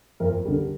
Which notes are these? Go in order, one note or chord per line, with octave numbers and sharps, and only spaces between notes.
F2 A#4
D3 G3